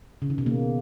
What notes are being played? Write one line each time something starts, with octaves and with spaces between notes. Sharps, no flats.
C#3
D#3
B2
A#3